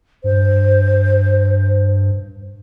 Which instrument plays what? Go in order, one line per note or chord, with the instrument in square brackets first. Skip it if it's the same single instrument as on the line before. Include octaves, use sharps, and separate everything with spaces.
[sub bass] G2 [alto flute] C5